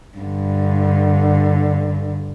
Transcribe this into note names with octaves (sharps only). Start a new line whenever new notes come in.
G2 D3